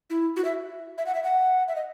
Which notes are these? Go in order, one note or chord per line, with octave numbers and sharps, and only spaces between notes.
E4
F#4
E5
E5
F#5
E5
F#5
E5
D#5